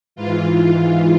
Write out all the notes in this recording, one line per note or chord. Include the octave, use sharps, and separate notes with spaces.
G#2 E3 F4
F4
F4